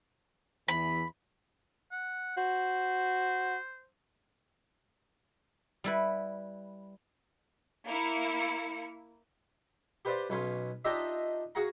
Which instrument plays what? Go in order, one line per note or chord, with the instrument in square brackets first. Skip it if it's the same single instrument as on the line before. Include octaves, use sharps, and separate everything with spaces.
[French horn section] E2 E3 [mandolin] B5
[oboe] F#5
[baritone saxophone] F#4 [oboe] C5
[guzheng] G3 E4 B4
[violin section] A#3 E4 C#7
[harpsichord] G4 B4 C5 D5 F5
B1 C#4 B4 F5 C6
D4 D#4 F4 G4 D#5 E5
F#4 G#4 F5 F#5 A#5